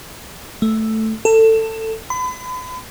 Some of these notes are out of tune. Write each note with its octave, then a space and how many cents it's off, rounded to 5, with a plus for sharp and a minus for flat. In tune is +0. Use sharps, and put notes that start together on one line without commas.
A3 +0
A4 +20
B5 +40